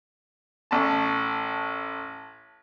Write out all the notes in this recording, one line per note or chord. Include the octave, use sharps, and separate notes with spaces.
A1 A5